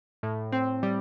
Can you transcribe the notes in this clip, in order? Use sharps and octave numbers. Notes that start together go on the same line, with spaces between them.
A2
C4
G3